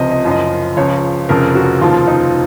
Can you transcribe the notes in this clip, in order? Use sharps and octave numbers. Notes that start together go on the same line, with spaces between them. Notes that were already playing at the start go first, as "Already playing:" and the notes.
Already playing: C#2 C3 F3 D#5
D#5
F#1 F#2 F3
D#5
C#2 C#3 F3 C#5
F1 F2 C#3 F3 A#4
F#4
F1 D#2 C#3 F3 F4
D#4